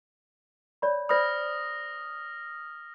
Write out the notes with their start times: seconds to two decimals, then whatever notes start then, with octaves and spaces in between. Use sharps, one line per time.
0.82 C#5 D5 B5
1.09 C5 D5 B5 D#6 F6 A#6